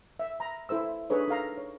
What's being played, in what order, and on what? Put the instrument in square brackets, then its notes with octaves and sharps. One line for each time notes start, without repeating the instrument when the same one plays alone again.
[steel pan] E5
A#5 B5
E4 A4 C5 E6
D4 D#4 G#4 A4 B4 C#5
D#4 A4 F5 A#5
C#5